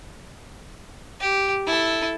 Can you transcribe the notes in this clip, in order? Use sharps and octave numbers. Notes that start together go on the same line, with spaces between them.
G4
E4 A4